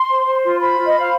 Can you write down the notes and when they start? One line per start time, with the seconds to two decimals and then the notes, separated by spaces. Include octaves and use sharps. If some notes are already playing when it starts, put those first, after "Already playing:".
Already playing: C6
0.09 C5
0.26 C5
0.43 F4
0.60 C5 B5
0.78 F4
0.86 D#5
0.95 C5 F5